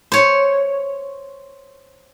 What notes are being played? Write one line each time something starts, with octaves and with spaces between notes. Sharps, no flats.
C5 C#5